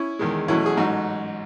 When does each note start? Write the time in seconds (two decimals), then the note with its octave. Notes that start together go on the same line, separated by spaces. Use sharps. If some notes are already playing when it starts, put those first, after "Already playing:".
Already playing: C#4 E4
0.19 E2 D#3 G#3
0.48 E2 B2 F#3 A3 C#4 E4
0.66 G#4
0.77 A1 G#2 F#3 D#4 F#4